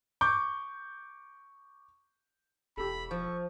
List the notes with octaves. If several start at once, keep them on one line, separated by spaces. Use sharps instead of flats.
C#6 D6 G6
E1 G4 A4 B5
F3 C#6